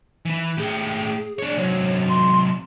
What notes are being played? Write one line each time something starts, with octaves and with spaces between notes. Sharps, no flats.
E3 B4
A2 G4 G#4
D4 C#5
C3 F#3 C#5
C6